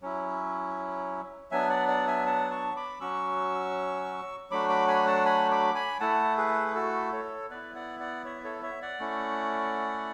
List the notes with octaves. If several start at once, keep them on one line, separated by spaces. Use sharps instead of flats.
F#3 C#4 E4
F#3 B3 D4 E5 G#5
D5 F#5
D5 F#5
E5 G#5
F#5 A5
A5 C#6
B5 D6
F#3 C#4 F#4 C#6 E6
F#3 A3 D4 F#4 B5 D6
B5 D6
G#5 B5
F#5 A5
G#5 B5
B5 D6
G#5 B5
A3 E4 F#5 A5
G#4 B4
F#4 A4
A4 C#5
B3 E4 B4 D5
D5 F#5
D5 F#5
C#5 E5
A4 C#5
C#5 E5
D5 F#5
A3 C#4 E4